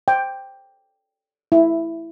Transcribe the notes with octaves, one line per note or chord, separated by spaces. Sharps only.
G5
E4